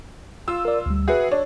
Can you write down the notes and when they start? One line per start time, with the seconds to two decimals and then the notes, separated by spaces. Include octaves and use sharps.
0.48 F4 E6
0.65 A#4 D5
0.86 D2 G3
1.08 F#4 G#4 B4 E5 F#5
1.32 D4 C#5